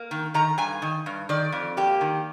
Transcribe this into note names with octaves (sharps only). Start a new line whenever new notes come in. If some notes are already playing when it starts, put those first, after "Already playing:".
Already playing: A#3
D#3
D#3 A#5
G2 G#5
D#3
G2
D#3 D5
F2
A#3 G4
D#3